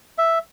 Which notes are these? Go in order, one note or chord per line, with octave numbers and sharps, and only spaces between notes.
E5